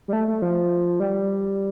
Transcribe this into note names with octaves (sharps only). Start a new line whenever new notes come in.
G3
A3
A3
F3
G3